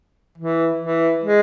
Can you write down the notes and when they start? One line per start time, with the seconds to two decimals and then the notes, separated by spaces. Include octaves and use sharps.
0.38 E3
0.80 E3
1.24 G#3